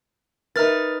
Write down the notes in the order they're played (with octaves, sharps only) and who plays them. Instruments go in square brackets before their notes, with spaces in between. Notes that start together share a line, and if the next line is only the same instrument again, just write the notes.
[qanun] D#4 B4 [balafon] A#4 E5 [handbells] F6 A6